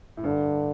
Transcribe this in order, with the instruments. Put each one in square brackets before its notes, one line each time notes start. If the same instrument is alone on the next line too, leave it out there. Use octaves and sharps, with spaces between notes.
[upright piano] A2
[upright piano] G2 [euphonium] D3